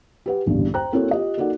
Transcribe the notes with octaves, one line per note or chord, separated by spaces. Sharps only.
G4 B4 F#5
D#1 A1 E2 G2 D3
C5 G5 A#5 F#6
A#3 C4 E4 F#4 A4 C#5
F4 G4 D#5
A#3 D#4 F#4 A4 D5 F#5